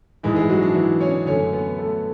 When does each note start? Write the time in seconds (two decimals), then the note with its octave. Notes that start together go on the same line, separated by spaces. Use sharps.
0.23 G#2 E3 G#3 E4
0.36 G#3 G#4
0.50 F#3 F#4
0.62 D4
0.75 E3 E4
1.00 C#4 C#5
1.26 F#2 D3 A3 C#4 C#5
1.52 B3 B4
1.78 A3 A4